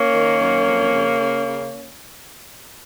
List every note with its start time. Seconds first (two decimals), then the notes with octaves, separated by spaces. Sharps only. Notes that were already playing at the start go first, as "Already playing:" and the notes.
Already playing: A#3 C#4
0.12 D#3
0.39 F#2
0.66 F2
0.92 C#3
1.19 C#3
1.46 C#3